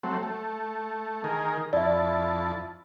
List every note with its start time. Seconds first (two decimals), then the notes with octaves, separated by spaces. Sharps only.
0.03 F#3 A3 C4
0.23 A3
1.24 D#3 G#4 A#4
1.73 F2 E4 D5 E5 A5